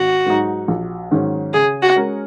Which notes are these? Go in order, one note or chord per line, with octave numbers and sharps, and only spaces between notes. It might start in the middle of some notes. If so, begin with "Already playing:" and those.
Already playing: G#1 F#4
G#2 F#3 D#4
A#1
G#2 D#3 F#3 C#4
C#3 G#4
F#4
G#3 C#4 A#4